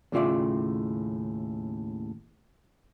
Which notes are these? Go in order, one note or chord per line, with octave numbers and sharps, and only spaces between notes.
D#2 A2 C#3 F4 D5 E5